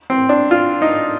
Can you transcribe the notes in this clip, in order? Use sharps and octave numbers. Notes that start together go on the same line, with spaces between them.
C4
D4
F4
D#4